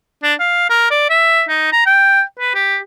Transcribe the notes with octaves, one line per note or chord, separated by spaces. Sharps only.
D4
F5
A#4
D5
E5
D#4
A#5
G5
B4
G4